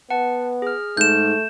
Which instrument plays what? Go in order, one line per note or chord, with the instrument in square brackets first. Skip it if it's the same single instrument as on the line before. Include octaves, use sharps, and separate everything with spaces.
[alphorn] B3 [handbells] F#5 A5
[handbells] G#4 F6
[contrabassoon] G#2 [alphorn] A3 [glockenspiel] G6 E7